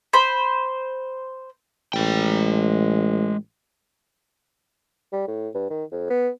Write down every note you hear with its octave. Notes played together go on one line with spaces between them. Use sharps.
C5 B5
A1 G#3 G5
G3
A2
G2
D#3
F2
B3